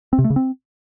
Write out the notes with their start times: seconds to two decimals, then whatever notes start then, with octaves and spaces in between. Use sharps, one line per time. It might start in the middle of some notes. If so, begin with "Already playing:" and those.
0.13 C4
0.19 C3
0.24 A3
0.30 C#3
0.36 C4